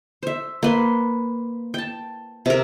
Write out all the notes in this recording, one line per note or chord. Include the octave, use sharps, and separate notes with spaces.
C5 E5
A#3 B4 C6
G5 A5
C3 A#4